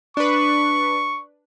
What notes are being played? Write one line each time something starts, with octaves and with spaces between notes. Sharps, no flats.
D4 B4 C#6